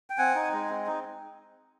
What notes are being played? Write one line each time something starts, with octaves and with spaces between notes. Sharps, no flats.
G5
C4 F#5 G#5
D#4
G#3
C4
D#4